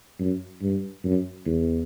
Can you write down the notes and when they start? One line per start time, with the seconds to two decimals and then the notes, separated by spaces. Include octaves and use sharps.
0.19 F#2
0.62 G2
1.04 F#2
1.46 E2